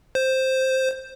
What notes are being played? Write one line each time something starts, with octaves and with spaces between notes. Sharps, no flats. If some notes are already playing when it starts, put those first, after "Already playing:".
C5